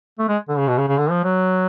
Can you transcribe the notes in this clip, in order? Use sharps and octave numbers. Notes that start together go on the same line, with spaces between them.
A3
G#3
D3
C#3
B2
C#3
C#3
D3
F3
F#3